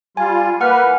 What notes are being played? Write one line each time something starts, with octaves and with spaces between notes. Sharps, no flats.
G3 F4 G#5
A#3 B4 F#5 F6
E3